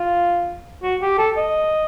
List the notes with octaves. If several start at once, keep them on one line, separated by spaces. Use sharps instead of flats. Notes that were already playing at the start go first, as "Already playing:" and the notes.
Already playing: F4
F#4
G4
A4
D#5